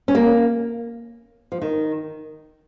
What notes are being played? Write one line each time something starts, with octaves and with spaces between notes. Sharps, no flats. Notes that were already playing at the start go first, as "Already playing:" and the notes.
C#4
A#3
F3
D#3